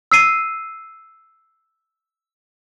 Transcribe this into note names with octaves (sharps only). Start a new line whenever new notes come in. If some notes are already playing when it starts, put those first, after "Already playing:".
E6 C7 D#7